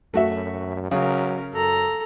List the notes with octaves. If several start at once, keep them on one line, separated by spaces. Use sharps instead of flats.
F#2 A3 F#4 E5
C#3 F#3 C#4 A#4
F#2 A4 A#5